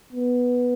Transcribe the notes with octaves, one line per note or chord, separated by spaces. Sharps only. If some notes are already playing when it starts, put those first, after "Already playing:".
B3